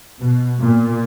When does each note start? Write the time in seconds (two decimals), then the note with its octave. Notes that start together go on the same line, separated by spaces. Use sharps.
0.20 B2
0.59 A#2